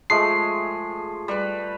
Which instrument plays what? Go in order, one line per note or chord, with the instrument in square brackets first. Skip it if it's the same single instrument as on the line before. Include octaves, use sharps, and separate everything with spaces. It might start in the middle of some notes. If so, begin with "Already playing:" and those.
[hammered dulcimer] F3 G#3 A3 [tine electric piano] C7
[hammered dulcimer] G3 B4